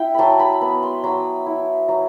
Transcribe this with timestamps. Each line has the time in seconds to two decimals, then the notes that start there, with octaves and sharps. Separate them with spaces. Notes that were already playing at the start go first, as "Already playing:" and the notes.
Already playing: E4 G5
0.14 F#3 A5 B5
0.40 B5
0.61 B3 B5
0.83 C6
1.04 F#3 B5
1.46 E4
1.89 F#3